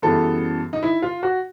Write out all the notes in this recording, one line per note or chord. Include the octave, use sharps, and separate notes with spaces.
F#2 C#3 E3 G3 B3 A4
D#4
E4
F4
F#4